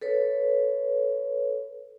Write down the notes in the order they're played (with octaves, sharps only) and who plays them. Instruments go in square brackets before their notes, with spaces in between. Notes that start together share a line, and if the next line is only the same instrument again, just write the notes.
[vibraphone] A4 B4 C#5